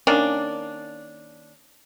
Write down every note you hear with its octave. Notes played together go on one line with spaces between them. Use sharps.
D#3 A#3 C#4 D4